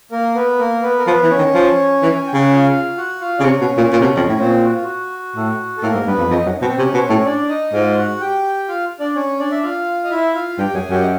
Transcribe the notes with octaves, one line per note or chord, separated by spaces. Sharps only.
A#3 A#4
B3 B4
A#3 A#4
B3 B4
A#4
F3 B3 B4
E3
C#4 C#5
D#3
F3
E3
G#5
G5
C#3 F#5
F4 F5
F#4 F#5
F4 F5
C#3 D5
C3 C#4 C#5
B2
A#2
A#2
C3
B2
F2
A2
A#2 C4 C5
F#4
F4
F#4
A2
A4
A2 A#3 A#4
G#2
G2 B3 B4
F2
F2 D#4 D#5
F#2
B2 C4 C5
C3 C#4 C#5
B2
C5
C#4 C#5
A2
D4 D5
D#4 D#5
G#2 F4 F5
F#4 F#5
G4 G5
F4 F5
D4 D5
C#4 C#5
D4 D5
E5
F4 F5
D#5
E4 E5
F4 F5
G2 G4 G5
F#2 G#4 G#5
F#2 G4 G5
D#5